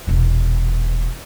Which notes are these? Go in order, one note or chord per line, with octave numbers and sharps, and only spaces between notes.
E1 A#2